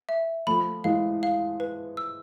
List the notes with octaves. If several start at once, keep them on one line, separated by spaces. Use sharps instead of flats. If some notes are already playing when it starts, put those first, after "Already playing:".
E5
F3 A3 B5
E3 G#3 F5
F5
B4
E6